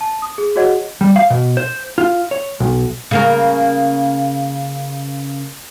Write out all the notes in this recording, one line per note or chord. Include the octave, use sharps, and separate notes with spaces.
A5
D#6
G#4
F#4 G#4 C#5 D#5 F#5
G3
F5
B2
C5
F4
C#5
B1
C#3 A#3 A#4